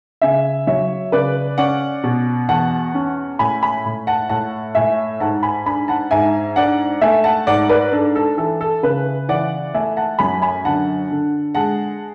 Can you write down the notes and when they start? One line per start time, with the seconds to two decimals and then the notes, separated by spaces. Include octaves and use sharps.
0.22 C#3 E5 G#5
0.67 F#3 C#5 E5
1.12 C#3 B4 D5
1.58 C#4 D5 F#5
2.04 B2
2.48 E2 F#5 A5
2.94 C#4
3.39 A2 G#5 B5
3.62 G#5 B5
3.85 A2
4.07 F#5 A5
4.29 A2 F#5 A5
4.75 A2 E5 G#5
5.20 G#2 F#5 A5
5.43 G#5 B5
5.66 D4 G#5 B5
5.88 F#5 A5
6.11 G#2 E5 G#5
6.56 D4 D5 F#5
7.01 A3 E5 G#5
7.24 F#5 A5
7.47 G#2 D5 F#5
7.69 B4 D5
7.92 D4 A4
8.16 A4
8.37 E3 A4
8.61 A4
8.83 C#3 B4
9.29 E3 D5 F#5
9.74 A3 E5 G#5
9.97 F#5 A5
10.19 F#2 G#5 B5
10.42 G#5 B5
10.65 D3 F#5 A5
11.10 D3
11.55 G#3 F#5 A5